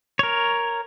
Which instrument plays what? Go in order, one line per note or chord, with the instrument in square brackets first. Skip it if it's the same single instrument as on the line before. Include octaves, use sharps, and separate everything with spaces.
[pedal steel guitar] A#4 C#5